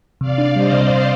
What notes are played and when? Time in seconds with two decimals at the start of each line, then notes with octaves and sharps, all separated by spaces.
0.21 C3 D5 F5
0.38 D4
0.55 G3 C5 D#5
0.73 C3
0.90 C3